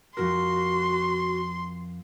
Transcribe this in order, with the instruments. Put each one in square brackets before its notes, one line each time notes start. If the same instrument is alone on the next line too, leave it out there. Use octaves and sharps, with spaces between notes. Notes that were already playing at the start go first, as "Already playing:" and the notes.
[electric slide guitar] F2 A#2 A#4 [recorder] F#4 [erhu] C6